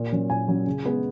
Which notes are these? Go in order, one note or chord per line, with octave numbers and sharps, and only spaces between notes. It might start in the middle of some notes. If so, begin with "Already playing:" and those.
Already playing: A#2
F#3 C#4
A#2 G#5
F#3 C#4
C#3
G#3 B3